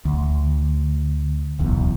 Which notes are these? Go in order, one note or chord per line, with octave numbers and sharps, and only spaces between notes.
D2
D1 B1 E2